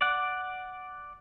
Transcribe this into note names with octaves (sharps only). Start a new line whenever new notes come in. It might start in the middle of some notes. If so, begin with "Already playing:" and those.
D5 F#5